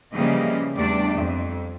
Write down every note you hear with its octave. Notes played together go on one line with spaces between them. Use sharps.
C#3 E3 F3 G3 A#3 D#5
E2 G3 A3 D4 D5
F2